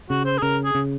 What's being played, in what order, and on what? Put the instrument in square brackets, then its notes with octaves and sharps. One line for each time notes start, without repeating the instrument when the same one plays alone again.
[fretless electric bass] C#3 [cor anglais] F#4
[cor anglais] C5
G#4
[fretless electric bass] C#3 [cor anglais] A#4
[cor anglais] G#4
[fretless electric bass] C#3